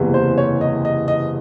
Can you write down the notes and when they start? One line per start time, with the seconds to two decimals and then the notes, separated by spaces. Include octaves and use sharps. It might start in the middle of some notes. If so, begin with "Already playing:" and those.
Already playing: F#1 E2 C3 E3
0.14 C5
0.38 C#5
0.61 D#5
0.85 D#5
1.08 D#5